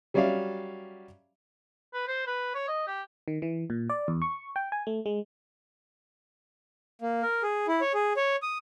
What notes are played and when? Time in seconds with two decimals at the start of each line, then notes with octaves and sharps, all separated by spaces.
0.14 F#3 G3 C#4 D5 E5 F5
1.94 B4
2.08 C5
2.27 B4
2.55 C#5
2.68 D#5
2.87 G4
3.28 D#3
3.42 E3
3.70 A#2
3.90 D5
4.08 E2
4.22 C#6
4.56 G5
4.72 G#5
4.87 A3
5.06 G#3
7.02 A#3
7.22 A#4
7.43 G#4
7.68 E4
7.81 C#5
7.94 G#4
8.17 C#5
8.42 D#6